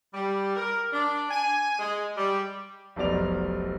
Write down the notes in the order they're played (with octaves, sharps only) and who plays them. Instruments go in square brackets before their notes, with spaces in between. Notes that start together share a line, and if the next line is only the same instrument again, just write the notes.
[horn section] G3
A#4
D4
G#5
G#3
G3
[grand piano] F1 B1 B2 D5 F7